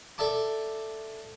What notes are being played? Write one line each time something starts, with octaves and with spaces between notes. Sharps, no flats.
A4 D5 E5 A5 D6